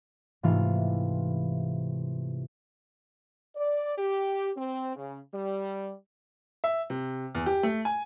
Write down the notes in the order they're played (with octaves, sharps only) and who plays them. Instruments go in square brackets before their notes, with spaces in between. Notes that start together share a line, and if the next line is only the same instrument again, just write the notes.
[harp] G#2 C3 E3 A3 F4 F5
[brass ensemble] D5
G4
C4
C#3
G3
[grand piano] E5
C3
E2
G4
A3
G#5